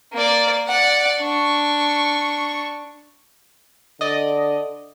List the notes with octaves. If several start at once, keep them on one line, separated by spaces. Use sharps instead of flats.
A#3 D5
D5 F#5
D4 C#6
D3 D5 D#5